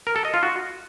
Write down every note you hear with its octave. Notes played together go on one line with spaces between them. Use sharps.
A#4
A4
D#5
F4
F#4